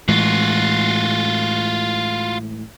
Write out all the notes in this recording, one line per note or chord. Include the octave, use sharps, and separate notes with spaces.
A2 E3 G#3 F4 F#4